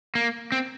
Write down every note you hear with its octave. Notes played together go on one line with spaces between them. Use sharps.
A#3
C4